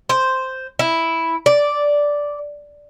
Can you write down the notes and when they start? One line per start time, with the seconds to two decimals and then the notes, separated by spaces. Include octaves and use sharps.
0.09 C5
0.79 E4
1.46 D5